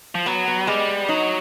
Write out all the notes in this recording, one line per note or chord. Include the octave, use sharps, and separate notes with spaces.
F3
F#3 B3
B3
G3 G#3
B3
F#3 D#4